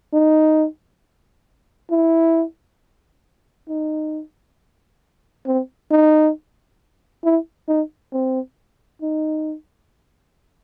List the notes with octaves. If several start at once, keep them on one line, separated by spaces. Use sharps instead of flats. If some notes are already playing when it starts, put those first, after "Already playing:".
D#4
E4
D#4
C4
D#4
E4
D#4
C4
D#4